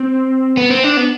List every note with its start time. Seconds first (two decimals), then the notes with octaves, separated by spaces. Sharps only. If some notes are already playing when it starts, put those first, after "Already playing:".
Already playing: C4
0.57 B3
0.70 C4
0.83 D4
0.97 B3